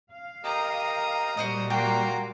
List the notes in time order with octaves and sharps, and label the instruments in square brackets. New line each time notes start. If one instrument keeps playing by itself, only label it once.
[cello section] F5
[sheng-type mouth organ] G4 A#4 D#5 [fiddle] A#5 D#6
[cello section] A#2 G3 [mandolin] F#4 C5 D#5
[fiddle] A#3 C6 [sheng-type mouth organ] F#4 A#5 D6 [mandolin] G5